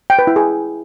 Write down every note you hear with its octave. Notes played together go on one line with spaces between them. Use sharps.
G5
B4
E4
G#4